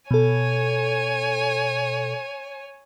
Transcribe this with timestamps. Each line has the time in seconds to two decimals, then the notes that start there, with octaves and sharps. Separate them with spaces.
0.11 B2 A4 C#5 G#5